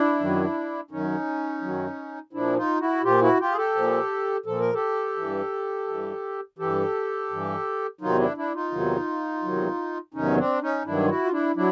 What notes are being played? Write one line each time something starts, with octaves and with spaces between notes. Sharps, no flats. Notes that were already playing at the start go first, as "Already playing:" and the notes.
Already playing: D4 E4
F#2 D#3 F#3
F#2 D#3 F#3 C#4 D#4
F#2 D#3 F#3
A#2 F3 D4 E4
D#4 F4
E4 F#4
A#2 F3 F4 G4
E4 F#4
F4 G4
G#4
G4 A4
A#2 F3
A#2 F3 A4
A#4
G4 A4
G2 E3
G2 E3
G2 E3 G4 A4
G2 E3
E2 C3 D#3 F#3 D#4 F4
D4 E4
D4 E4
D#4 F4
E2 C3 D#3 F#3
E2 C3 D#3 F#3
E2 C3 D#3 F#3 C#4 D#4
C4 D4
C#4 D#4
G2 D#3 F#3 D4 E4
F4
E4 F#4
F4
D4 E4
F#3 D4 E4